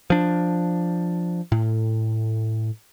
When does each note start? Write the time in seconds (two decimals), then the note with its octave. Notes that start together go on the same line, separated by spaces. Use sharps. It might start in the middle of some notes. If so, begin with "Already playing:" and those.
0.10 F3 D4
1.52 A2